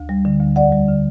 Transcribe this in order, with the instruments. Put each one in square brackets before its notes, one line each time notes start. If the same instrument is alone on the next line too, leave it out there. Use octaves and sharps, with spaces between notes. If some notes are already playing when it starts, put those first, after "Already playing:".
Already playing: [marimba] D2
G3
D3
D2
E2 D5 F#5
G3
D3